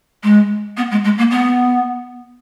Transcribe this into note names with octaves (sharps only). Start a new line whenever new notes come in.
G#3
B3
G#3
G#3
A#3
B3